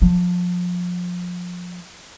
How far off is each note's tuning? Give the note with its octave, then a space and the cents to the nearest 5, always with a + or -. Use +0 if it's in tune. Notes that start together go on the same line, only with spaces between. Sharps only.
F3 +30